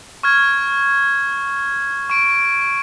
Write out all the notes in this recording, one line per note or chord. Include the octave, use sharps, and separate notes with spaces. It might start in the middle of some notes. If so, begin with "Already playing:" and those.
C#6 F6 G#6
C#6 D7